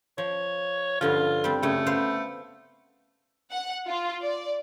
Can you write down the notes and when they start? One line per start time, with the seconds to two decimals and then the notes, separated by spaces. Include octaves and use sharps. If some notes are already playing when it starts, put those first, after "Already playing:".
0.18 F3 C#5
1.01 G2 D3 F3 F4
1.44 G3 C4
1.63 F#2 C#3 A3
1.86 B3 C5 F5
3.51 F#5
3.86 F4
4.23 D5